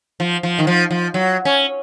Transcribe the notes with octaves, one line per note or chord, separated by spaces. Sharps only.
F3
F3
D#3
F3
F3
F#3
C#4